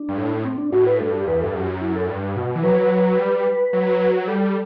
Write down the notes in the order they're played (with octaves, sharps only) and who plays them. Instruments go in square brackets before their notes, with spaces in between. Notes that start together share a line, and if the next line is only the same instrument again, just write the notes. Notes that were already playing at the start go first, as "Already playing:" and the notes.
Already playing: [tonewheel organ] D4
[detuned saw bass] G2
A2
[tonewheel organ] C4
D4
[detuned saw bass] A2 [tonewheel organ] F#4
[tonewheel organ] B4
[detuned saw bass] G2 [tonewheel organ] A4
[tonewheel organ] G4
[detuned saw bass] E2 [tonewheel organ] B4
[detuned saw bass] G2 [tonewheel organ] A4
[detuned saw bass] F#2 [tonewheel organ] G4
[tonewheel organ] E4
A4
[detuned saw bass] G2
B2
E3
[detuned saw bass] F#3 [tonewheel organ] B4
[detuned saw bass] G3
F#3
[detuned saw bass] G3 [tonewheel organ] A4